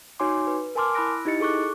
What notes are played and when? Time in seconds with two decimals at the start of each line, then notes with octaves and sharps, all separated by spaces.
0.20 D#4 F#4 C#5 G#5 C6 D6
0.47 B4
0.75 A#4 G#5 A5 C6 D6 F6
0.94 E4 B5 E6 F#6 A#6 D7
1.25 D#4 E4 G4 D#5 A6 C#7
1.40 G#4 A4 C#6 D6 F#6